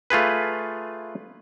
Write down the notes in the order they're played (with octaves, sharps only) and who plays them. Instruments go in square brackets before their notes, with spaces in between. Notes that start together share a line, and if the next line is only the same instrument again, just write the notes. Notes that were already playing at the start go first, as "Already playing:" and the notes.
[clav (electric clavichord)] A3 F4 G#4 B4